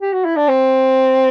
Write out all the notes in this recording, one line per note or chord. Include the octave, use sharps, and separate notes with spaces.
G4
F#4
E4
D4
C4